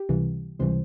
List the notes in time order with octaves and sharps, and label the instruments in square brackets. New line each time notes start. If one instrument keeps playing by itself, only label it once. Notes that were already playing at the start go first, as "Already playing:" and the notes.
Already playing: [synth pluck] G4
C#2 C3 E3 G3
C#2 C3 E3 G3 C5